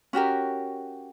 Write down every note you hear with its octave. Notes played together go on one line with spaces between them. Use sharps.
C#4 F#4 G4 A#4